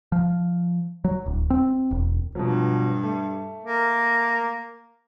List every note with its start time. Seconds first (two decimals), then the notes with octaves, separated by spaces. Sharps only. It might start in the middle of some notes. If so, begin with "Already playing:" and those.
0.12 F3
1.05 F#3
1.26 D1
1.50 C4
1.91 E1
2.35 G2 B2 F3 F#3
3.03 A3
3.64 A#3